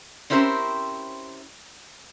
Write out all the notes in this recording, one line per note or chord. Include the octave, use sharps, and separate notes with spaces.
C4 C#4 E4 G4 A#4 C5